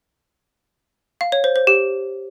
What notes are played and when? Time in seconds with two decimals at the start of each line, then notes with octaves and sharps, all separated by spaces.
1.21 F5
1.32 C#5
1.44 C5
1.56 C5
1.67 G4